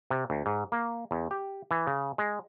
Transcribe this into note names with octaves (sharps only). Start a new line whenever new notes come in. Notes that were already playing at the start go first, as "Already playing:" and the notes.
C3
D2
G#2
A#3
E2
G4
E3
C#3
G#3